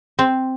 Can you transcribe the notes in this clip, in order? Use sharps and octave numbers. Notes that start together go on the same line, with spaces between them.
C4